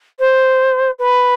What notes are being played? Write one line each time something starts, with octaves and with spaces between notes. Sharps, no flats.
C5
B4